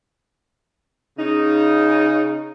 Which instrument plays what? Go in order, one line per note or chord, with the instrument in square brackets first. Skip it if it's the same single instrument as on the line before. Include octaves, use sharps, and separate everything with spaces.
[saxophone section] C#3 D#4